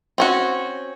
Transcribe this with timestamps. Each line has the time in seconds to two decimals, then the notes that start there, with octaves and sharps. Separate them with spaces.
0.18 C4 C#4 F#4